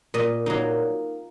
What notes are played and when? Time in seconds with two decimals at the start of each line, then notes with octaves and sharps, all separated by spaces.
0.14 A#2 D#5
0.46 F#3 A#3 D#4